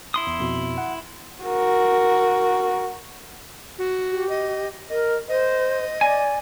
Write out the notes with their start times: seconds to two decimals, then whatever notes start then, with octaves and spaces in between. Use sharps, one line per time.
0.14 E4 C6 D#6
0.27 E2
0.40 F2 B2
0.78 F#5
1.44 F#4 A#4
3.79 F#4
4.09 G4
4.29 D#5
4.90 A#4 D#5
5.29 C5 D#5
6.01 D5 G#5